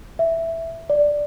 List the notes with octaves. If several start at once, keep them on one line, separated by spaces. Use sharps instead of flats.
E5
D5